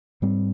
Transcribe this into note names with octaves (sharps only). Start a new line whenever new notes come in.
G#2 G3 C4